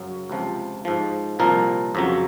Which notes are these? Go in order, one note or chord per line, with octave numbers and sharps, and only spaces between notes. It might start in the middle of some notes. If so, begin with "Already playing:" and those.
Already playing: F#2 C#3 F#3
C#2 C3 F3
G#2 F3
C2 A#2 F3 A#4
F2 C#3 F#3